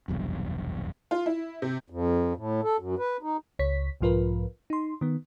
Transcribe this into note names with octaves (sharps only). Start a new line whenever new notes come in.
F1 B1 E2 G2
F4
E4
C3
F2
A2
A4
F#2
B4
D#4
C#2 C#5 B6
B1 G#2 F3 F4 A#4 B4
D#4 C6
D#3 B3